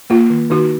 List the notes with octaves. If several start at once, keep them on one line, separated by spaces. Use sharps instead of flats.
A#3 F4
D#3
D#3 D#4 F#4